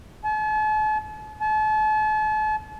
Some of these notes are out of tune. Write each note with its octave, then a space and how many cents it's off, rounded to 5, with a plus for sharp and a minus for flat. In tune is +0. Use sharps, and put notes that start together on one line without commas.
A5 -45
A5 -40